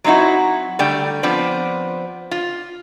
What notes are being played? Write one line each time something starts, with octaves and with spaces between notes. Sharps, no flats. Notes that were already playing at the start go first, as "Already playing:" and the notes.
F#3 C4 D#4 E4 F#4
D3 G3 A3 G5
F3 B3 C4 D4
F4